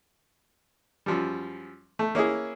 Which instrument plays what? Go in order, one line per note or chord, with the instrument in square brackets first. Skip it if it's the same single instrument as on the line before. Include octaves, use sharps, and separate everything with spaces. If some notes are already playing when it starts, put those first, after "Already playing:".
[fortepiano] F#2 F3 G3
A3
A#3 C#4 E4 G#4